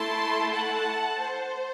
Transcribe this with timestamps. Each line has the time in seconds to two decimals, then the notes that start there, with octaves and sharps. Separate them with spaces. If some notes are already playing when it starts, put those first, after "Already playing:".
Already playing: A3 E4 A4 A5 C6
0.52 F#5 A5
1.20 C5